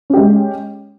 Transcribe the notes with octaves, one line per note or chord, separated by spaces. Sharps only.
G#3 C#4 G4